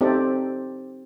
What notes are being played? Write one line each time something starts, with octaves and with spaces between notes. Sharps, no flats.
C4 D#4 G4 A4 D5